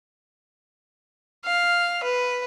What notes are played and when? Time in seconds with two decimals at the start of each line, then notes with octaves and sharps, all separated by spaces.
1.45 F5
2.04 B4